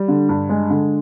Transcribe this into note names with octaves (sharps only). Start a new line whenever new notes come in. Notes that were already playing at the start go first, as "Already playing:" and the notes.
Already playing: G3
D3
G2
G#3
D3